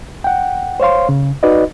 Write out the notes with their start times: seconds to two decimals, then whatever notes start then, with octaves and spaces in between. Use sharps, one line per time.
0.24 F#5 G5
0.80 C5 C#5 F5 C6
1.09 C#3
1.43 D#4 F#4 B4 D5 D#5